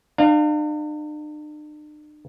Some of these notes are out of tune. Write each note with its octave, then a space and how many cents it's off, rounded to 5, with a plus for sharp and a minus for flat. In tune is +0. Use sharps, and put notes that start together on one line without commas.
D4 +45 F5 +0